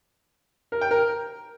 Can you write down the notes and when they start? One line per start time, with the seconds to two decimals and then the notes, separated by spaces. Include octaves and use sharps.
0.72 A#4
0.81 G5
0.91 A#4